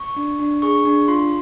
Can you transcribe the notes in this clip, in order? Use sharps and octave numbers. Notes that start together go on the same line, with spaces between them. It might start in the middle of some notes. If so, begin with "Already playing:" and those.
Already playing: C#6
D4
D4
G#4 C#6
D4
F4 C6